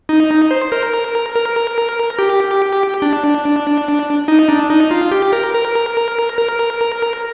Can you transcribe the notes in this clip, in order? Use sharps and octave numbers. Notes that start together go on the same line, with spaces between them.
D#4
C5
A#4
A#4
G4
D4
D#4
D4
D#4
F4
G4
A#4
A#4
A#4